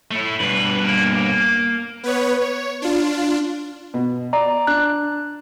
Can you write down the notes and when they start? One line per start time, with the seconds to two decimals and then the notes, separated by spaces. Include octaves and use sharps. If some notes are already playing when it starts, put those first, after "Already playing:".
0.11 A3 E4
0.41 G2 B2 B4
0.85 A#3
2.03 B3 B4 C#5
2.41 C#5
2.82 D4 F4
3.94 B2
4.33 D5 A#5
4.67 D4 F#6